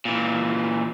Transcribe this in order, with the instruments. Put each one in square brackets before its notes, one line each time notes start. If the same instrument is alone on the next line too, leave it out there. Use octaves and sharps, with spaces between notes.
[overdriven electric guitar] A#2 E3